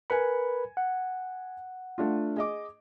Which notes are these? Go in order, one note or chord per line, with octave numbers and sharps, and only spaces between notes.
A#4 B4 G#5 B5 C#7
F#5
A3 D4 F4
G#4 D#5 D6